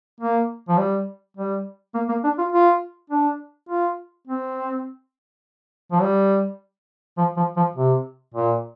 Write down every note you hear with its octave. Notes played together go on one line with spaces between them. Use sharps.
A#3
F3
G3
G3
A#3
A#3
D4
F4
F4
D4
F4
C4
F3
G3
F3
F3
F3
C3
A#2